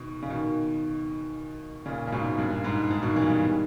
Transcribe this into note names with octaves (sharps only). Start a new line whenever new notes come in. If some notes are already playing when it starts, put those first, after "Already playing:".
Already playing: B2 D#3
C#3
B2 D#3
A#2 C#3
C#3
G#2 B2
G2 A#2
G#2
G#2
B2 D#3
C#3 E3
D#3 G3